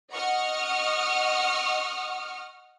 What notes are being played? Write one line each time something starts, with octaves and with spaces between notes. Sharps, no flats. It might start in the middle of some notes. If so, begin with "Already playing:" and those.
D#5 F#5 C#6 D#6 F6